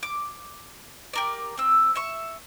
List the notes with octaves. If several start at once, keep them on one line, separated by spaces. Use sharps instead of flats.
D6
G4 A#4 D5
C4 E6
E5 C#6